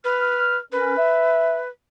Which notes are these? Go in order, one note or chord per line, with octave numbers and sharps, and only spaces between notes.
B4 F6
C#4 A#4 B4
E5